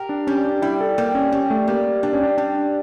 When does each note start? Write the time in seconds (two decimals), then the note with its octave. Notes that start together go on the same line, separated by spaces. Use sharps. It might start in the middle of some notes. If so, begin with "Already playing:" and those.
Already playing: G4 A#4
0.09 D4
0.27 G3 C#4
0.45 D4
0.62 G3 E4
0.81 A4
0.98 G3 A#3
1.15 C#4
1.32 G3 C#4
1.50 A3
1.68 G3 A#3
2.03 G3 D4
2.13 C#4
2.23 D4
2.38 G3 D4